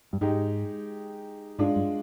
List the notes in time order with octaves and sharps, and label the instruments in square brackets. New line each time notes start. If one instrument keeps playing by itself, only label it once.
[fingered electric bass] G2
[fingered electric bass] G#2 [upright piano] G#3 D#4 G4
[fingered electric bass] G#2 [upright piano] G#3 D4 F4
[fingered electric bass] G2